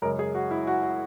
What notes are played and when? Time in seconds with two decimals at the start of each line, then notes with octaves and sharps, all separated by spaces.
0.02 F#2 C#3 G#3 A#4
0.19 G#4
0.35 F#4
0.51 E4
0.67 F#4
0.83 F#4